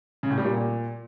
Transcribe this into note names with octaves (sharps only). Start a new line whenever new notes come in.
C#3
A2
G3
A#2